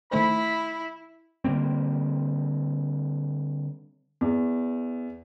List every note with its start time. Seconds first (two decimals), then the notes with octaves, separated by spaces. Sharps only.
0.11 D#3 A3 E4 C5 B5
1.45 D3 G3 A#3 C4
4.21 E2